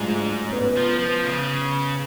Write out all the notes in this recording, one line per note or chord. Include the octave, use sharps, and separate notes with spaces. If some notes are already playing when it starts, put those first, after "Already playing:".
Already playing: G#2 F#3 G#3 A3 D4 F4
D4
C#4
B3
F3
B3
F3
C#3